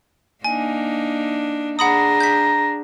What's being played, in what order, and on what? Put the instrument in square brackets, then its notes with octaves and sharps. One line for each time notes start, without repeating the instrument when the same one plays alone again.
[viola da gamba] A#3 D4 D#4 [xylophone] G#5
[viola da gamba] D4 G#4 [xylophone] F#5 B5 D#6 [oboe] A#5
[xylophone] G6 B6